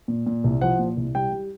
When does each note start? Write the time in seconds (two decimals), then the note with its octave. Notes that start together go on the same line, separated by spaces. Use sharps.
0.08 A#2
0.26 A#2
0.44 C2
0.61 F3 F#5
0.79 A#2
0.97 C2
1.15 G3 G5
1.32 G3